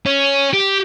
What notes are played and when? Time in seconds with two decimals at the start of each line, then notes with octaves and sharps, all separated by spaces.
0.06 C#4
0.53 G4